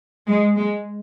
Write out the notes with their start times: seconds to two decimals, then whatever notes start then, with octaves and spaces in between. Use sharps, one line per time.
0.28 G#3
0.56 G#3